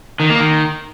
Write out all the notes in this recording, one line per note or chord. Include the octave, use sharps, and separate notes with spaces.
D#3
A#3
D#3